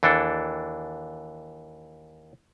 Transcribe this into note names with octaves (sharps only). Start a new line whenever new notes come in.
D#2 E3 D4 A4